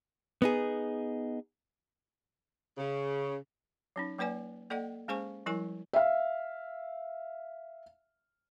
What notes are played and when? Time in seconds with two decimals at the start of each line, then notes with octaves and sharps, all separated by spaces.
0.42 B3 D#4 G#4
2.77 C#3
3.96 F#3 C#4 D#4
4.18 F#3 A#3 B4 D5 G#5
4.70 A#3 A4 D5 D#5 F#5 G5
5.08 G#3 C#4 G#4 C5 G#5 C#6
5.46 F3 G3 E4 A#4 G#5 C#6
5.93 E5 F5